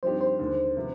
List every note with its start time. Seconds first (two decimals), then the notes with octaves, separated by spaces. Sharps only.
0.03 G2 F3 C4 D#4 G4 C5
0.21 C5
0.39 D#2 D3 G#3
0.77 C3 F3 B3